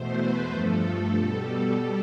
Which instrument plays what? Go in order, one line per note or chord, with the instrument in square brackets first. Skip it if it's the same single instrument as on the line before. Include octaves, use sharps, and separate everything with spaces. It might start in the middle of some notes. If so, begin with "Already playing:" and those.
Already playing: [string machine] E2 B2 A3 C5
B4
G2 F3 A3 A4
B2 G3